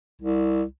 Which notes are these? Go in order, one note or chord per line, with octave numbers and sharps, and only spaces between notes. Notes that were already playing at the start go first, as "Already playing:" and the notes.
C2